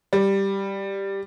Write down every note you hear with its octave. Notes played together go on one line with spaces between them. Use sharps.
G3